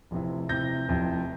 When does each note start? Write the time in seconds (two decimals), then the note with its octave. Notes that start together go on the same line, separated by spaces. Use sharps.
0.11 F1 F2 C3 E3
0.49 F1 F2 C3 E3 G6 A#6
0.88 F1 F2 C3 E3